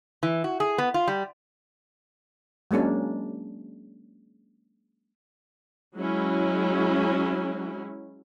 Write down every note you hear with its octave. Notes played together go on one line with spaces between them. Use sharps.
E3
F#4
G#4
B3
F4
G3
F#3 G#3 A#3 C#4 D4
F#3 G#3 C#4 E4